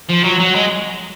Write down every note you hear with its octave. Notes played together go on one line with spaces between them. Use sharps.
F3
F#3
F#3
G#3